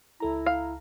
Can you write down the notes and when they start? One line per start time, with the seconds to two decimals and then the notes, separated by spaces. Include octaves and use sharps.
0.20 C#2 E4 A4 A#5
0.46 F5